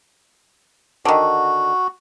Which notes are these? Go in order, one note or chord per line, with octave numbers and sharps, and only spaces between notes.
D3 D#3 F#4